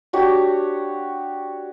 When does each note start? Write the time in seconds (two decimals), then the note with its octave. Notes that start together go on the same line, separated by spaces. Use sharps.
0.13 D4 F#4 G4 C#5